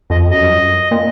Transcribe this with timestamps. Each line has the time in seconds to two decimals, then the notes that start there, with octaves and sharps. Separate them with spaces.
0.10 F2 D#5
0.31 F#2 D#5
0.91 A#2